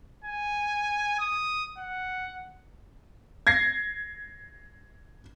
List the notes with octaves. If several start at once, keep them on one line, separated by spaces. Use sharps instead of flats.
G#5
D#6
F#5
G#6 A#6 C7